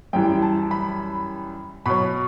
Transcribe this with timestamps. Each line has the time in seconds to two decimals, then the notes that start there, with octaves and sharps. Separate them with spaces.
0.13 F#2 E3 G3 G5
0.42 A5
0.71 B5
1.86 B2 F#3 B5